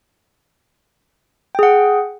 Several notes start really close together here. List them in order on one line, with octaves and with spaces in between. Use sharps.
G5 G#4 F#5